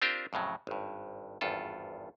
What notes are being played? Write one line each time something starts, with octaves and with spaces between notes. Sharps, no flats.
C4 D4 F4 G4 A#4 C5
F2 A2 C#3 F#3
G#1 G2
G#1 E2 G2 F4 A4